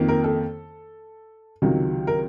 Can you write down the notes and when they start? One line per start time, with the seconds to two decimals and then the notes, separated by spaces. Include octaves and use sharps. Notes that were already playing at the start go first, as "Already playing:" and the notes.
Already playing: F2 D#3 A#3
0.09 A#4
0.24 A4
1.62 C#2 C3 D#3 F#3
2.07 A#4